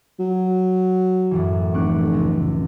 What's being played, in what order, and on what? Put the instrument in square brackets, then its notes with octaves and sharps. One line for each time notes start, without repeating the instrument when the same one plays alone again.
[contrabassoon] F#3
[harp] F#2 A2 E3
[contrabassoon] F1 [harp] C#6 D6 F#6
[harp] C#2